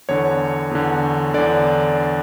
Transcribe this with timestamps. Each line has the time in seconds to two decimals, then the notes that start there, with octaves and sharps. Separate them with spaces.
0.09 E2 D3 C#5
0.71 E2 D3
1.34 E2 D3 D5